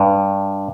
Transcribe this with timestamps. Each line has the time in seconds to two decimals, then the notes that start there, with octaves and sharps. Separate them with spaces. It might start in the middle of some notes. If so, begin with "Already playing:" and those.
Already playing: G2